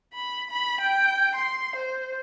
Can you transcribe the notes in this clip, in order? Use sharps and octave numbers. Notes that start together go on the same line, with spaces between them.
B5
B5
G5
C6
C5